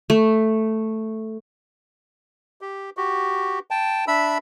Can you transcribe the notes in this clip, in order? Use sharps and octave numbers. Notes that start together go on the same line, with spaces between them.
A3
G4
F#4 G4
G5 A5
D4 E5 B5 E6